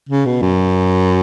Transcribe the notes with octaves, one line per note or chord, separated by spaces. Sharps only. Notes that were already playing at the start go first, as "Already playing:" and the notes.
C#3
B2
F#2